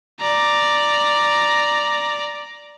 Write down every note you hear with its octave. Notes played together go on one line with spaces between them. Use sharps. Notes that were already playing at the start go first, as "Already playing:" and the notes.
D5 A#5